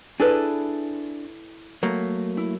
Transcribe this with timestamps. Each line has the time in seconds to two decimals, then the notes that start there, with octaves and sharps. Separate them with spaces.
0.20 D4 E4 G#4 A4 B4
1.83 F#3 A3 A#3
2.37 E4